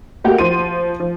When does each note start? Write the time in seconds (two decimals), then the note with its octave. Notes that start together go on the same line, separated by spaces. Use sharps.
0.24 A3 A#3 F#4 G4 F#5
0.38 F3 C6 D#7
1.00 F3